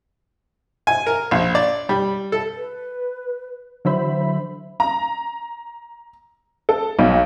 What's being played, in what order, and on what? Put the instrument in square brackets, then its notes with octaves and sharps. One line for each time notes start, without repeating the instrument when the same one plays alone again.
[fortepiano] G#5
A#4
A#1
D5
G3
A4
[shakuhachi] B4
[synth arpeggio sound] D3 E3 F#3 C5 E5 B5
[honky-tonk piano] A#5
A4
B1